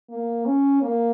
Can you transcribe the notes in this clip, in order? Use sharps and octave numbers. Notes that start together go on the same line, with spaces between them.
A#3
C#4
A#3